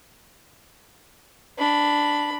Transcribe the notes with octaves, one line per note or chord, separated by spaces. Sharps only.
D4 B5